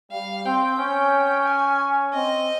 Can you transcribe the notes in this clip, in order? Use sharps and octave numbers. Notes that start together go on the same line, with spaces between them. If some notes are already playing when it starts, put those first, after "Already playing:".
G3 F5
C4 G5
C#4
G#5
C4 D#5